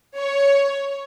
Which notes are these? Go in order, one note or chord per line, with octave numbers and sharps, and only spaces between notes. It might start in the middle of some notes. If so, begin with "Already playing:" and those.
C#5